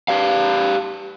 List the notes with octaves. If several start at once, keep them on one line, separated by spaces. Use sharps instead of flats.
G4 D5 F5